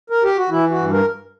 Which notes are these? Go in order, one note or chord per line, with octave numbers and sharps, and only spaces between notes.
A#4
G4
F#4
E3 E4
F#4
G2
A#4